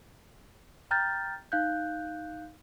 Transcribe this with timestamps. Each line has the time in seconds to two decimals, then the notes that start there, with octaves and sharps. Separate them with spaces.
0.91 G5 A#5 F6 G6 A6
1.52 D#4 F5 F#6 G6